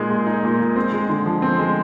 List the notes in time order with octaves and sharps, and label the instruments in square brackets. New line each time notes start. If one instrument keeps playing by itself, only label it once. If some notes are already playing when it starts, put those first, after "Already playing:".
Already playing: [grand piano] A#2 G#3 D#4
G#4
D#4
A#2
G#3
C4
G#3
D3
F3
C4
G#3